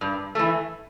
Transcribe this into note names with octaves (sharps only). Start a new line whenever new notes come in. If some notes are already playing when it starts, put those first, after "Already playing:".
G2
E3 A3